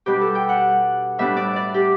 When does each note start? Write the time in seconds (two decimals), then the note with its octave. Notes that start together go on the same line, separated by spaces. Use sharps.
0.06 B2 G3 D4 G4
0.21 A4
0.35 G5
0.49 F#5
1.18 A2 G3 B3 D4 E5
1.37 D5
1.56 D5
1.74 G4